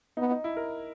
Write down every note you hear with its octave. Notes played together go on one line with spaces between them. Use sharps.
B3 D#4
D#4
E4
A#4